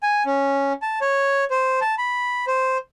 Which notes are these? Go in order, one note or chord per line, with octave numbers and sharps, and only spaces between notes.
G#5
C#4
A5
C#5
C5
A5
B5
C5